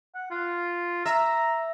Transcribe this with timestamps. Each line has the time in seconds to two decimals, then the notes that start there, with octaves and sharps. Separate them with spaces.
0.15 F#5
0.31 F4
1.06 E5 A#5